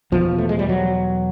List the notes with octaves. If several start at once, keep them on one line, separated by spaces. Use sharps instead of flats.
E2 B2 F3
A3
G#3
G3
F#3